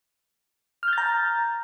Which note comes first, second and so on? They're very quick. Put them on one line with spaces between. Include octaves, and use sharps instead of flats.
F6 G6 A6 A#5